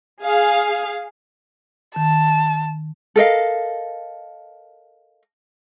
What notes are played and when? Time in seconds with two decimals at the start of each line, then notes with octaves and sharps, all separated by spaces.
0.21 G#4 F5
1.96 D#3 A5
3.16 A4 A#4 D#5 F5